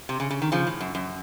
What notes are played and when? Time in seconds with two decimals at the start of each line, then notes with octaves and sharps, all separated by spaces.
0.09 C3
0.20 C#3
0.30 C#3
0.42 D#3
0.52 C#3 F3
0.67 A2
0.80 F#2
0.95 F#2